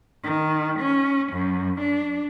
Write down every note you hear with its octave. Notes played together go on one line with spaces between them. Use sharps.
D#3
C#4
F#2
D4